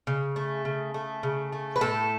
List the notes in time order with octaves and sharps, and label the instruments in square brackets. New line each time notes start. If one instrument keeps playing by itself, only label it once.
[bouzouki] C#3
A3
C#3
A3
C#3
A3
B4
A2 A4